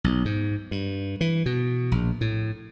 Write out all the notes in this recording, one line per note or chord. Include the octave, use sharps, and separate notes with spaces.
B1
G#2
G2
E3
B2
A#1
A2